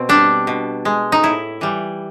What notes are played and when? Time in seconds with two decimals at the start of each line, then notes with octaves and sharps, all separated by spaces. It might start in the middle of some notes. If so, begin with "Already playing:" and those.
Already playing: B2 C4
0.09 G3 D4
0.47 B2
0.85 G#3
1.12 D#4
1.23 A2 E4
1.61 E3 G3